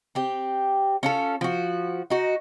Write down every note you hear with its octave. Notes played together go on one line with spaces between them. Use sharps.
C4 G4
C#4 F4 A4
F3 F#4
D#4 F#4